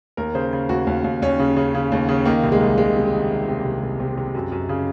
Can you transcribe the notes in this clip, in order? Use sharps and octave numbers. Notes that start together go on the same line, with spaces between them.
D#2 A#4
C#3 C5
C#3
D#2 F#4
D#2
D#2
D#2 C#4
C#3
C#3
C#3
D#2
C#3
D#3 A#3
C2
G#3
C2
C3 G#3
C3
D#3
D#3
C3
C2
C2
C3
C3
F#2
F#2
C#3